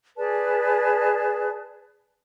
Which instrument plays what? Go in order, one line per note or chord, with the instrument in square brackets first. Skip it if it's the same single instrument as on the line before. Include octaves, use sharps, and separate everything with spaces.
[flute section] G#4 B4 D5 A5